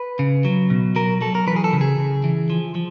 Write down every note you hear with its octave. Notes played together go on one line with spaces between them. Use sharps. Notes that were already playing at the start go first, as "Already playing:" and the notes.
Already playing: B4
C#3
F#3
B2
F#3 A#4
F#3 A4
A#4
E3 B4
G#4
A4
C#3
G#4
C#3
E3
F3
F3